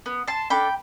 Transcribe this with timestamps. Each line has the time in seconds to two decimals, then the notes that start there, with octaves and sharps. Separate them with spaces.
0.06 B3
0.28 A5 C6
0.50 D4 A4 G5 B5